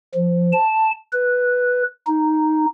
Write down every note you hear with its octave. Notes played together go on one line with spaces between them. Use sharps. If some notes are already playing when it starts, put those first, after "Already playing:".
F3
A5
B4
D#4